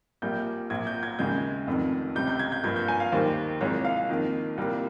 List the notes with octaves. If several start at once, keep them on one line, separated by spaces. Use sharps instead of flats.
A#1 A#2 G3 A#3 G6
A#1 A#2 F3 G#6
G6
G#6
D#2 C#3 G#3 G6
F1 F2 D#3
C#2 C3 G3 G6
G6
G#6
G6
G2 F3 A#3 G#6
G6
G#5
F5
D#2 D#3 G3 A#3 C5
C2 A#2 F3 G#3 C#5
F5
F2 D#3 A#3
C2 A#2 G3 A#3